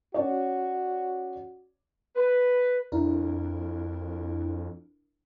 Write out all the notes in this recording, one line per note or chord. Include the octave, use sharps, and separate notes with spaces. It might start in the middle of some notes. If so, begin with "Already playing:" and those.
C#4 F#4 C#5 D5
B4
F2 D4 E4 A#4